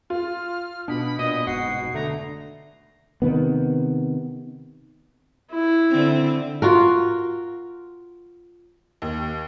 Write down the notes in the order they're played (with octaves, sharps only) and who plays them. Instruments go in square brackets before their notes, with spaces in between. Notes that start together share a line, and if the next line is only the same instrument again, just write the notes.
[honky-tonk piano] F4 [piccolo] F6
[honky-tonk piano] B2 [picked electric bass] D4 [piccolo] B5
[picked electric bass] A#2 [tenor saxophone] D#5 [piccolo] D#6
[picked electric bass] F1 G#2 [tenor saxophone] F#4 [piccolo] C7
[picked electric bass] D3 [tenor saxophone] A3 [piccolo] A#5
[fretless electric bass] C3 D#3 B3
[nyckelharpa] E4
[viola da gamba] D3 C4
[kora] F4 F#4 A#4
[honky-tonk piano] D#2